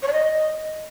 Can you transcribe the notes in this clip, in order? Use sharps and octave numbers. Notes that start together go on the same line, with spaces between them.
C#5
D5
D#5